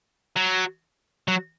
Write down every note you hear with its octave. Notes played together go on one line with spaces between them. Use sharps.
F#3
F#3